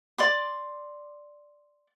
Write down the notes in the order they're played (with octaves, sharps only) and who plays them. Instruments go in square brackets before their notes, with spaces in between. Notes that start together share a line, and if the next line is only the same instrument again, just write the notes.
[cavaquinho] D5 C6 D6